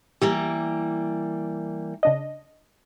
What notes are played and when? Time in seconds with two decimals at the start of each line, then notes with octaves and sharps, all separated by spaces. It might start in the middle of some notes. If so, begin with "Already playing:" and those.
0.22 E3 G3 A#3 G4
2.03 C#3 D4 D#5